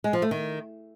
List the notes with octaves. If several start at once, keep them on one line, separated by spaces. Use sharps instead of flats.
G#3
F3
A3
D#3